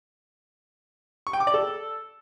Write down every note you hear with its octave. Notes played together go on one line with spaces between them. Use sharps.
C#6
G5
D6
D5
A4